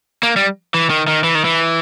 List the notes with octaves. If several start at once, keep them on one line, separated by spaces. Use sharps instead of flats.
A#3
G3
E3
D#3
D#3
E3
D#3
E3